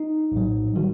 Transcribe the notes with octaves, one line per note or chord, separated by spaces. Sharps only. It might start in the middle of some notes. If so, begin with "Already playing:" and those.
Already playing: D#4
A#1 A2 F#3
D#3 G3 F#4